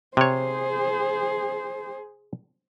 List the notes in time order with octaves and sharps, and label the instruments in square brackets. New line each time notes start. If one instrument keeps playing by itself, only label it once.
[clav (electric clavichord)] C3 C#5 [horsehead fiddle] G#4 C5